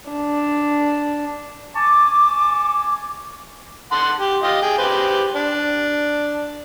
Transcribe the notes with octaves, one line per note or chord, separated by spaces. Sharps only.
D4
G#5 A5 C#6 D6
F#5 A5 C6
G4
F4 G4 D#5
G#4 G5
G4 B4 C5
D4